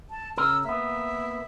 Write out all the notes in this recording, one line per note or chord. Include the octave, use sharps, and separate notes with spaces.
A5
C#3 A#4 E6
A#3 B3 E5